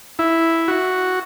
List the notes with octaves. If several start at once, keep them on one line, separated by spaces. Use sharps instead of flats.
E4
F#4